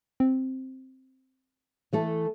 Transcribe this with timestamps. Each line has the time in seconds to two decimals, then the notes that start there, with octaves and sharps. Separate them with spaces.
0.20 C4
1.93 E3 A3 A4